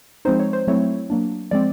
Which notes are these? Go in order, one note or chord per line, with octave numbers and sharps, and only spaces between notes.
F3 G#3 C4 D#4 C5
C#5
C5
F#3 A3 C4 E4 C#5
F#3 A#3 D4
F3 G#3 C4 D5